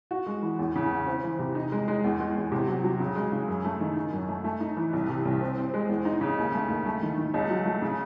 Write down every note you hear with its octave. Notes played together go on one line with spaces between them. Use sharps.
F#4
G#3
E3
E2
C#3
E2
C4
E3
C3
D#4
G#3
G#3
E2
G#3
E2
C3
F#3
F#3
C#3
G#3
C#3
F#2
A3
D#3
D#4
F#2
A3
A3
D#4
E3
C2
C3
C2
C4
C4
G#3
E2
D#4
C#3
D#2
A3
D#2
A3
D#3
D#3
C#2
F#3
A3
C#3